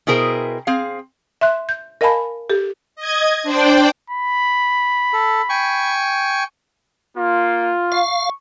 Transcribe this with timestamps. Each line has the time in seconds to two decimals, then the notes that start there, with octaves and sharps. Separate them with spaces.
0.07 B2 E4 G#4 A#4 C5 G5
0.67 C4 G#4 F5
1.41 E5 C6 F#6
1.69 G6
2.01 A#4 D#5 F5 G#5 A5 B5
2.50 G4 A4
2.95 D#5 G#6
3.43 D4 C5 D5 G5
4.10 B5
5.13 A4
5.49 G5 G#5 C#6
7.17 A#3 F4
7.92 F5 C#6